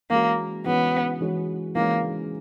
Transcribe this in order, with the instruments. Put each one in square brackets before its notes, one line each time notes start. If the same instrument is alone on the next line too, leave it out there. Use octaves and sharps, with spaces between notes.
[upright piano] E3 G#3 C#4 F#4 [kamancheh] A#3
[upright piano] E3 G#3 C#4 F#4 [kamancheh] B3
[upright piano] E3 G#3 C#4 F#4
[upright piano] E3 G#3 C#4 F#4 [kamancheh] A#3